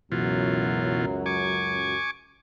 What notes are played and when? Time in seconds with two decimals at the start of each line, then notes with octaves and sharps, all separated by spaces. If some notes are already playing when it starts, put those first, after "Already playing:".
0.12 C#2 F#2 B2 E3 F#3 F4
1.26 G#5 C#6 D6